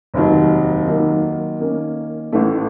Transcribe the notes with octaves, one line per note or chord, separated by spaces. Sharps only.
F1 D#2 D#3 F#3
D#3 F#3 A#3
D#3 A#3 C#4
A1 A2 A3